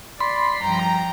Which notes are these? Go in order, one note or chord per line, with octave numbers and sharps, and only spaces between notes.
D5 B5 C6
G2 F3 G5 A#5